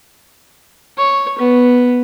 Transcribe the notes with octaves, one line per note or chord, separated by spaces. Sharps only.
C#5
B3